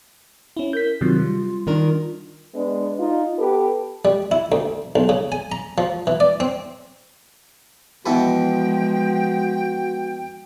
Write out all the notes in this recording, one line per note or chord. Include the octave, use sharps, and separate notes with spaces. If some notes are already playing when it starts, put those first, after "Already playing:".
C#4 E4
A#4 G6 B6
C3 D#3 F#3 F4
G3
D#3 D4 A#4
G#3 B3 D4
D#4 F4
B3 G4 A4 B4
G3
E4
D2
B1
C#3
G#5
A#5
F3
E3
D5
C4
B2 E3 F3 G#3 F#4 B4 G5